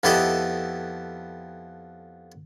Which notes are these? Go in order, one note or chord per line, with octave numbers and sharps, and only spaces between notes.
F2 B3 E4 G4 A4 D#5